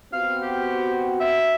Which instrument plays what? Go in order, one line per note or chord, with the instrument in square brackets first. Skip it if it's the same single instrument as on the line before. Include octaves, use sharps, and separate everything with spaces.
[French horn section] B3 C4 F#4 [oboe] F5
[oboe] G4
E5